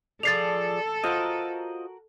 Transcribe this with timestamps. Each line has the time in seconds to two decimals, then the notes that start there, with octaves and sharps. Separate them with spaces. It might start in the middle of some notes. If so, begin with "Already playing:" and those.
0.23 F3 G#4 A4 D5 A6 C7 F7
1.04 F4 F#4 A#4 C5 D#5